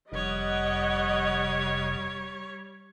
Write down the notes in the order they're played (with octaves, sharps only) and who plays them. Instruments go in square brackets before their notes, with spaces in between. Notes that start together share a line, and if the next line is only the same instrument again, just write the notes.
[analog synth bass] F1 [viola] G3 C#5 [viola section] D#5 F#5